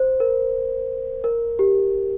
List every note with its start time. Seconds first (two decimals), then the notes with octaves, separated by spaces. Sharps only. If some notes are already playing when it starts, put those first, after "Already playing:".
Already playing: C5
0.20 A#4
1.24 A#4
1.59 G4